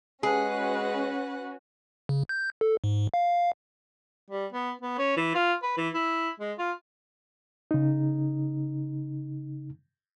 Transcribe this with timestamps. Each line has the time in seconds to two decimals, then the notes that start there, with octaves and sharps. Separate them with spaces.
0.23 G#3 C#4 F#4 G#4 B4 F#5
2.09 C#3
2.29 G6
2.61 A4
2.84 G#2
3.14 F5
4.30 G3
4.53 B3
4.82 B3
4.98 C#4
5.17 E3
5.35 F4
5.63 B4
5.77 E3
5.94 E4
6.40 G#3
6.58 F4
7.71 C#3 D#4